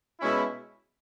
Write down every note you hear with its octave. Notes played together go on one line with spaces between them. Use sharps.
B2 G#3 C#4 E4